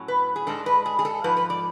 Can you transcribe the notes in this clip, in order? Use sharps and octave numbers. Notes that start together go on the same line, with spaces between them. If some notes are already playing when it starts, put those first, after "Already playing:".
Already playing: A2 F#3 C#4
B4
G#4
G#2 G#3 D4 A4
B4
G#4
G#4
A4
G#2 F3 B4
B4
D5